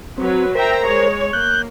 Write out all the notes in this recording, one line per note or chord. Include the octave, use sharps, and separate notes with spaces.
F#3 C4 B4
A#4 C5 E5 G5 A#5
G#3 C#5
A#3 F#6 G6